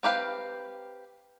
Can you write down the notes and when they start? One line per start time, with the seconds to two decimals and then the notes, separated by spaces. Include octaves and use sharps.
0.03 C4 G4 B4 F5